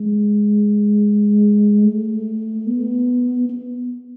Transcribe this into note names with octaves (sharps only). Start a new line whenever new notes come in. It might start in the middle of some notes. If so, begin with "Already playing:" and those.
Already playing: G#3
A3
B3
B3